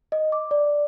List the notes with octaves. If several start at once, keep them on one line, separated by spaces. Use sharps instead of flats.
D#5
D6
D5